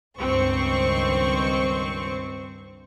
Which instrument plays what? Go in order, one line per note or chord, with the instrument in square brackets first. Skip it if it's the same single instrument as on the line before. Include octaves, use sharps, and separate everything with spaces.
[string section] C#2 G2 D#3 C4 C5 C#6